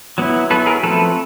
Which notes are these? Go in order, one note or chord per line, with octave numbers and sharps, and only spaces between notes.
F#3 B3 E4
F#3 B3 E4 A4 B4
G#4 A#4
F3 A3 C4 A4 B4